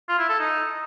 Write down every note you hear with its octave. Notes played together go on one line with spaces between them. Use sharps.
F4
E4
A4
D#4